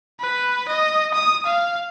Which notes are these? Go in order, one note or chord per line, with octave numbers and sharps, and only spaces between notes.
B4
D#5
D#6
F5